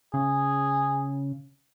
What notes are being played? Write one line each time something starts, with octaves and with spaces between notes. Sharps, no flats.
C#3 G#4